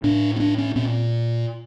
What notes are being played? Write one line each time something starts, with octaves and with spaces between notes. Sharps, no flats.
A2 D4
C#4
D4
C#4
A#2 C4